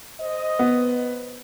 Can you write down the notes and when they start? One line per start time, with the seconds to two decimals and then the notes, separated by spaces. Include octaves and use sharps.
0.20 C5 D#5
0.59 B3